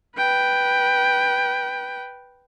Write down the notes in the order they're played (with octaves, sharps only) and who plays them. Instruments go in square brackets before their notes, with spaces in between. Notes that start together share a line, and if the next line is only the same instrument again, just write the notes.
[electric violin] B4 G5